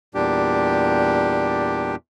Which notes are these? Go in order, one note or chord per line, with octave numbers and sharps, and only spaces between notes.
E2 A#2 G3 D4 G4